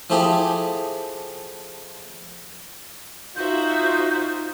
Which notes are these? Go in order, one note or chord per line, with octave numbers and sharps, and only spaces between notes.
F3 A3 E4 G4 G#4
D#4 F4 F#4 C5 E5 G6